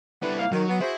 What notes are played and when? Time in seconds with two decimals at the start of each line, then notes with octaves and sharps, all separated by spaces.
0.22 D3 G3 B3 E4 B4
0.39 A#3 F5
0.52 D#3 F#3
0.68 B3 F#4
0.80 E4 F#4 G#4 C5